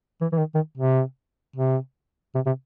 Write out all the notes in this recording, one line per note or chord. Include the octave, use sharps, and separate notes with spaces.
E3
E3
D#3
D#3
C3
C3
C3
C3